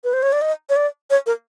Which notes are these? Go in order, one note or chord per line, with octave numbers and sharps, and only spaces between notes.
B4
C5
C#5
D5
D#5
C#5
D5
C#5
A#4